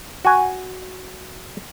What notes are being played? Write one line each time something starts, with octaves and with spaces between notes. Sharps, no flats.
F#4 G#5